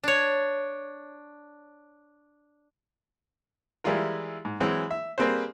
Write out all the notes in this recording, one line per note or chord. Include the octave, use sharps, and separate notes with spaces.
D4 C#5
E3 G3 G#3 E4 F4 A#4
G#2
E3 F#3 G#3 C4
E5
G3 A#3 C4 G#4 B4 C5